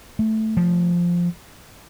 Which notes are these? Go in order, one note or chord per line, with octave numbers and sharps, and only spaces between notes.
A3
F3